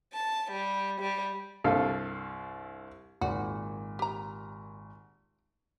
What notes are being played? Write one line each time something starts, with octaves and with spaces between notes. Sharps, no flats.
A5
G3
G3
C2 G2 A4 F5
G#1 A#2 F#4
G4 A#5